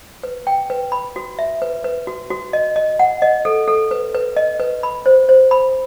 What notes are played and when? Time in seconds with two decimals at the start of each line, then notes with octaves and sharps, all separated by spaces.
0.23 B4
0.47 G5
0.70 B4
0.92 B5
1.16 F#4
1.39 E5
1.62 B4
1.84 B4
2.07 F#4
2.30 F#4
2.53 D#5
2.76 D#5
2.99 F#5
3.22 D#5
3.45 A4
3.68 A4
3.91 B4
4.15 B4
4.36 D#5
4.60 B4
4.83 B5
5.06 C5
5.29 C5
5.51 B5